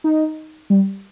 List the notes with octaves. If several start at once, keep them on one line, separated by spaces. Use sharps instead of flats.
D#4
G3